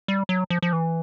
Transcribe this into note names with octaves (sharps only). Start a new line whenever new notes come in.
G3
F#3
F3
F3
E3